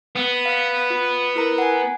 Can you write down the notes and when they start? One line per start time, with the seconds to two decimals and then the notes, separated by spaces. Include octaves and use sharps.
0.16 B3
0.46 F5
0.90 F4
1.36 E4 A#4 A#5
1.58 F#5 G#5